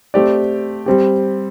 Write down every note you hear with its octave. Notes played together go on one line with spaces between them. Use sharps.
A3 C4 G4 D5
G3 C4 G4